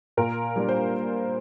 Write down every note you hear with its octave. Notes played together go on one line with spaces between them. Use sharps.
A#2 A#4
G3 A#3 D4
C5